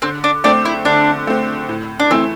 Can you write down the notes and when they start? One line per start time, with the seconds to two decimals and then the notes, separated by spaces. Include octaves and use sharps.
0.02 D3 C4
0.24 D4
0.44 A3 C4 D4
0.65 E4
0.85 D3 D4
1.27 A3 C4
1.69 A2
2.00 D4
2.10 E3 A3 C4 E4